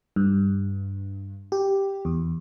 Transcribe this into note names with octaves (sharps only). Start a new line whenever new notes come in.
G2
G4
E2